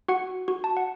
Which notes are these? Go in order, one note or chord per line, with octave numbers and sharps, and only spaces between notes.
F#4 F#5
F#4
A5
F#5